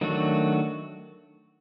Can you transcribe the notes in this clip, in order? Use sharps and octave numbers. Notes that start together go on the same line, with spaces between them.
D#3 F#3 A3 D4 F#4